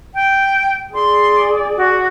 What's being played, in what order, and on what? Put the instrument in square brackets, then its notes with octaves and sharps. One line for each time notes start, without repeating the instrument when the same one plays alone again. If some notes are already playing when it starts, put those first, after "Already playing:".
[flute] G5
[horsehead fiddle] G#4 D5 [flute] C6
[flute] F#4